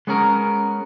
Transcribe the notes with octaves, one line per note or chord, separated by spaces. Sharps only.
G#3 B3 C#4 G#4 A#4